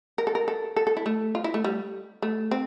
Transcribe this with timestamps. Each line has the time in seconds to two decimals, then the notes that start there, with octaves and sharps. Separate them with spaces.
0.18 A#4
0.27 A4
0.35 A#4
0.48 A4
0.76 A4
0.87 A4
0.97 E4
1.06 A3
1.35 F4
1.44 E4
1.54 A3
1.64 G3
2.22 A3
2.51 C4